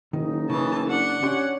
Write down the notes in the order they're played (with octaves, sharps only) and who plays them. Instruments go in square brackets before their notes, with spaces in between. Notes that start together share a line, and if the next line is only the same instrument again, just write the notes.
[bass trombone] F#1 [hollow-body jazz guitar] D#3 [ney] D#4
[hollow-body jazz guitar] C#3 [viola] E3 A5
[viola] D4 F#5
[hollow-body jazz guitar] C#4 G4 C6 [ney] C#5